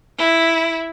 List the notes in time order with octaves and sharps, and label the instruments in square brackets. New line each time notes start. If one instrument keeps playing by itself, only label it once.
[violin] E4